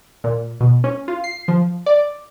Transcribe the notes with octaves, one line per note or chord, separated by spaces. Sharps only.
A#2
B2
C#4
F4
C7
F3
D5